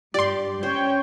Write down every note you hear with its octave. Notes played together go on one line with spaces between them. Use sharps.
G2 G4 D5 C6
C#4 C5 C#5 G5